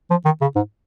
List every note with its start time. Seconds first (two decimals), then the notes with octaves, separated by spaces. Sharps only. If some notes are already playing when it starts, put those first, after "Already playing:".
0.10 F3
0.25 D#3
0.41 C#3
0.56 G#2